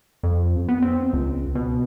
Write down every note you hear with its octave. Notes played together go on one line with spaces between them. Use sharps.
F2
B3
C4
C#2
B2